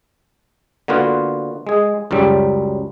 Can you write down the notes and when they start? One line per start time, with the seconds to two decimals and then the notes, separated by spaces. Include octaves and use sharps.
0.88 D3 A#3 B3 F4 F#4
1.67 G#3 G#4
2.11 C#2 F#2 F#3 G3